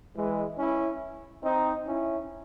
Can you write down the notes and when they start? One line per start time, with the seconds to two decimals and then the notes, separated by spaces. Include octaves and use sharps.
0.15 E3 G#3
0.58 C#4 E4
1.43 C4 D#4
1.86 C#4 E4